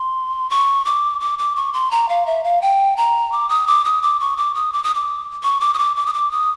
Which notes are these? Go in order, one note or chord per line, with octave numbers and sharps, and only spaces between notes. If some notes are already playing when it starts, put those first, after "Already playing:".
Already playing: C6
C#6
D6
D6
D6
C#6
C6
A#5
F5
E5
F5
G5
A#5
D6
D#6
D6
D#6
D6
C#6
D6
D#6
D6
D#6
D6
C#6
D6
D#6
D6
D6
D#6
D6
D#6